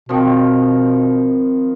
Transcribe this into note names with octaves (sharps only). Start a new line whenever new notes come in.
B2 D#3 F3 C4